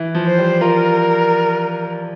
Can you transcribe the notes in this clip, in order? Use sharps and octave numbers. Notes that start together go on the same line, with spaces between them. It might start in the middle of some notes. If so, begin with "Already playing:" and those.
Already playing: E3
F3
C5
G3
F4 A#4